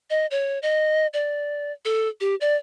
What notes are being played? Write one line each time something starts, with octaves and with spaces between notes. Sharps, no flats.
D#5
C#5
D#5
D5
A4
G4
D5